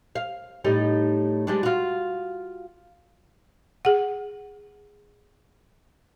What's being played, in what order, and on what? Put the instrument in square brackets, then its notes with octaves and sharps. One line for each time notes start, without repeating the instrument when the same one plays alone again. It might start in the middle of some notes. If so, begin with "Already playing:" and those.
[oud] F5
A2 G3 D#4
G3 G#3 D4
F4 F#4
[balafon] G#4 F#5